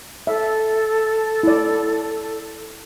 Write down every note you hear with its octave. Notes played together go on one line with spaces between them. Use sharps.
A4 E5
E4 D5